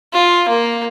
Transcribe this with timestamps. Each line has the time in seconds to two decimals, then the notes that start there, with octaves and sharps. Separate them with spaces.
0.13 F4
0.49 A#3